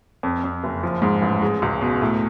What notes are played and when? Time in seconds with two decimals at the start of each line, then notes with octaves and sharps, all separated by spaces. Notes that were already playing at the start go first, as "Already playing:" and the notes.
0.23 F2
0.44 F2
0.64 F#1
0.83 F3
1.02 G#2
1.22 A1
1.42 G#3
1.62 C#2
1.81 B2
2.02 A2